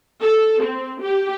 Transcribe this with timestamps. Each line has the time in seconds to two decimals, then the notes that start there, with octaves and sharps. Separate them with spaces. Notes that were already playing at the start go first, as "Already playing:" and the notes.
0.21 A4
0.62 C4
1.01 G4